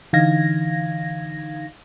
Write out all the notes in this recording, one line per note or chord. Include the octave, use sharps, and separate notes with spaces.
D3 E3 D#4 F5 G#6 A#6